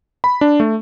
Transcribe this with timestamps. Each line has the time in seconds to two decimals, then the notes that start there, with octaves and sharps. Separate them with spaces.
0.24 B5
0.41 D4
0.60 A3